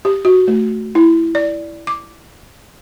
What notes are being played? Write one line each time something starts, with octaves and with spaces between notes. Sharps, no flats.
G4
F#4
A3
E4
D5
D6